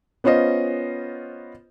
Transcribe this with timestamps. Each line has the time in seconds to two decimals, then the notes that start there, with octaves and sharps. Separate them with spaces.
0.24 B3 C#4 F4 C5 D#5